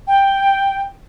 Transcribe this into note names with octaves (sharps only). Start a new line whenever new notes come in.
G5